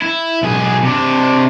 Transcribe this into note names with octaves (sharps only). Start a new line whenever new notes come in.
E4
B1 G#4
C3 D4